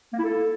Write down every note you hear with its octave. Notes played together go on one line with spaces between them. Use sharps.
A#3
E4
A4